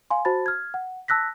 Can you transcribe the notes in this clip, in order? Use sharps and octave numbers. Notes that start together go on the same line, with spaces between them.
F5 G#5 C6
F#4 C5 A5 B5 A6
F6 G#6
F#5
A5 E6 F#6 A#6 B6